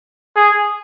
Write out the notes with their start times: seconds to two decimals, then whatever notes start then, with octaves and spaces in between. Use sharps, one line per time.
0.36 G#4